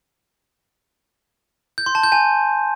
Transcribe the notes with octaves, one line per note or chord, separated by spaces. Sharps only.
G6
C6
A5
G6
G#5